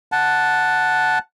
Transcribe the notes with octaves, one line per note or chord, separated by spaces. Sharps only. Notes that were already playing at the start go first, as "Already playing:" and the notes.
F#5 A5